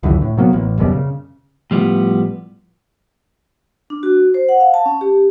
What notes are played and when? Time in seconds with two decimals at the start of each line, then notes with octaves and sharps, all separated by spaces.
0.03 C#2 F#2 D3 E3
0.22 A2
0.37 C3 F#3 A#3 B3
0.53 A1
0.78 D#1 F#2 B2 G3
0.91 C#3
1.71 A2 F3 G3 B3
3.90 D4
4.03 F#4
4.34 C5
4.49 F#5
4.60 F5
4.74 A5
4.86 C#4
5.01 G4